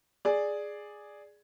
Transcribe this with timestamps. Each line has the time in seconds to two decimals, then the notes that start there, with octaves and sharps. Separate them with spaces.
0.25 G#4 D5